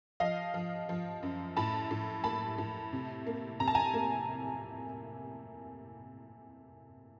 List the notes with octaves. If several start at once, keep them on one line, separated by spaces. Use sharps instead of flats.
F3 D#5 F5
F3
F3
F#2
A2 A5 B5
A2
A#3 A5 B5
A2
C3
A#3
C3 A#5
A5
G#5 A#5
A#3